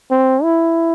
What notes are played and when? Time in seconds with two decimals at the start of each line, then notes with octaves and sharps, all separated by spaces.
0.11 C4
0.43 E4